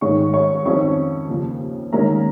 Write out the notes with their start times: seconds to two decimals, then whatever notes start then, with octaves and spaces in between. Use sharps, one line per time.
0.01 G#2 D#3 G#3 C#5 C#6
0.33 C#5 C#6
0.65 F2 D#3 C#4 C#5 C#6
1.28 D#2 C#3 F3
1.93 D#2 D#3 G#3 C#4 A#4 A#5